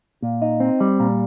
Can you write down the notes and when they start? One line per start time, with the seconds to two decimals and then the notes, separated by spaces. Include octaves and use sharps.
0.22 A#2
0.42 D#4
0.60 C4
0.80 G3
1.00 A#2